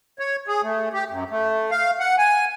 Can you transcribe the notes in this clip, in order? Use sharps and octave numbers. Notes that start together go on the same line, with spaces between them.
C#5
G#4
A3
G4
F#2
A3
F5
F#5
G#5